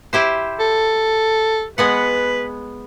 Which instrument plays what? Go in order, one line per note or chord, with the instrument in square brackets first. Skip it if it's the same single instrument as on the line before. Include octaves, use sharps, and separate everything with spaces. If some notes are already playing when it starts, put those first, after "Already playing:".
[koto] E4 G4 C5
[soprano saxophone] A4
[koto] G#3 B3 F#5 [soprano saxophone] B4